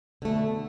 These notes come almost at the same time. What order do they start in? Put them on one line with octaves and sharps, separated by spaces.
D3 A3 B2